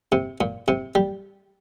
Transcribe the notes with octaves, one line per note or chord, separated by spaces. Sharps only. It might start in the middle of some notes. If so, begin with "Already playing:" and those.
C3
A#2
C3
G3